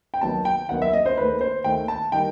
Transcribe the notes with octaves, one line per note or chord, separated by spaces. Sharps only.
G5
D#2 D#3 F#3 B3 A5
G5
D#2 D#3 F#3 B3 F#5
E5
D#5
C5
D#2 D#3 A3 B4
C5
D#2 D#3 A3 G5
A5
D#3 G3 G5